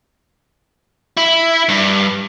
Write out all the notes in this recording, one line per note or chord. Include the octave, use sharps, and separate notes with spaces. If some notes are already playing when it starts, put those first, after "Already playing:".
E4
G2